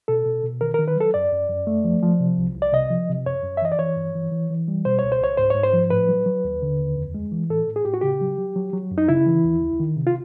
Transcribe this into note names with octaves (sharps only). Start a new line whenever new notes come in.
B2 A4
B2
B2
D#3 A#4
A#4
D#3
B4
F#3 A4
F#2 D5
F#2
F#2
A3
F3
F3
C3
C2
C2
D5
C3 D#5
F3
C3
F#2 C#5
F#2
E5
E3 D#5
D5
E3 C#5
G2
E3
E3
E3
G3
B2 C5
C#2 C#5
C5
C#2 C#5
G#2 C5
G#2 C#5
C5
F3
A2 B4
F#3
F#3
D#2
D3
D#2
F2
G#3
E3
A2 A4
A2
G#4
A2 G4
F#4
C#3 G4
F#3
F#3
F#3
F#3
F#2
D#4
C#3 E4
E3
D#2
C#2
D#3
C3
F4